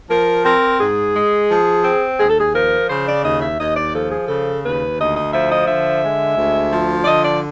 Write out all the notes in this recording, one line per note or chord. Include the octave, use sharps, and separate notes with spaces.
F3 A#4
C4 A#4
G#2 G#4
G#3
F3
C4
D#2 G#4
A4
G#4
F3 A#4
C#3 C5
D5
D#2 D#5
E5
D#2 D#5
D5
F3 A4
G#4
C#3 A4
D#2 B4
D2 D#5
D#5
F3 E5
D#5
D3 E5
G#3
D2
F3
D5
D3 D#5
D5